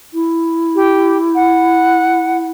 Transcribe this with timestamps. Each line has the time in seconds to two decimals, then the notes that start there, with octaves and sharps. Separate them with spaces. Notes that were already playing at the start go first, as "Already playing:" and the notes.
0.14 E4
0.75 G4
1.35 F#5